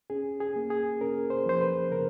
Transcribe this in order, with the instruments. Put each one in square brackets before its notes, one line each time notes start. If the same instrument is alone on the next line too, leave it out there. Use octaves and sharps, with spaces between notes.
[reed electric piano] C#4 G#4
G#4
A#3
G#4
C#4 A#4
C5
F3 C5
B4
C#3 A#4